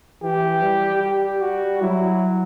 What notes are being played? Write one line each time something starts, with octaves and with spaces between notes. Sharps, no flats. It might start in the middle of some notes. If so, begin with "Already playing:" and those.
E3 G4
G3
G4
F#4
F#3 E4